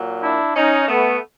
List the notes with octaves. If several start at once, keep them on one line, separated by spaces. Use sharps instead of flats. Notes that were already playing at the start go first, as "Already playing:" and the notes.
Already playing: A#2 F#3
D4 E4
C#4 D#4
A3 B3